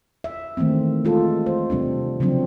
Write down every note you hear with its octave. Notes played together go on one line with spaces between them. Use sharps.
E5
D#3 E3 A3 A#3 C4
G#3 F4 A4
C5
C3 G3 C4 D4
C#3 F3 F#3 C4 D4